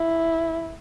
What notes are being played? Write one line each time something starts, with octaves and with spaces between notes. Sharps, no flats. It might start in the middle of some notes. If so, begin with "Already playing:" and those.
Already playing: E4